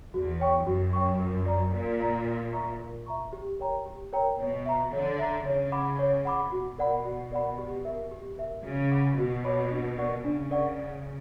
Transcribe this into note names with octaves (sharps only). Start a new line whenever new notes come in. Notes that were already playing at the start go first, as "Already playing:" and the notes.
E2 F#4
C#5 G5 C#6
F#2 F#4
C#5 G5 C#6
A#4
D5 A#5
A#2 A#4
D5 A#5
A#4
E5 A#5 C#6
A#4
E5 A#5 C#6
G4
A#4 C#5 G5 A#5
G4
A#4 C#5 G5 A#5
B2 C#5
E5 A#5
D3 C#5
E5 A#5
C#3 C#5
F#5 B5 D6
C#5
F#5 B5 D6
B2 F#4
A#4 D5 F#5 B5
F#4
A#4 D5 F#5 B5
G4
A#4 E5
G4
A#4 E5
C#3 F#4
C#5 F#5 B5 D6
B2 F#4
C#5 F#5 B5 D6
D4
A#4 D5 F#5 C#6
C#3 D4
A#4 D5 F#5 C#6